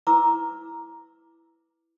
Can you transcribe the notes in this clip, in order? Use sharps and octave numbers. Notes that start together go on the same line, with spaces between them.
E4 B4 A#5 D6 E6